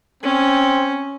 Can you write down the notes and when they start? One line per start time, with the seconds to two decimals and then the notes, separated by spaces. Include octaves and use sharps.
0.23 C4 C#4